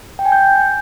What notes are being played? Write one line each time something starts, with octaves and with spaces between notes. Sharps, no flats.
G5
G#5
G6